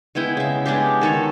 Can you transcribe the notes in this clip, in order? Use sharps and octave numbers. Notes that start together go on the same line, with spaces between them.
G#3 B3 E4 G5
C#3 E5
G#3 B3 D4 G4
D#3 A4 C#5